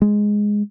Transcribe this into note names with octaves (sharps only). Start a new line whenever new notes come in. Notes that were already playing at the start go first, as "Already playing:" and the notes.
G#3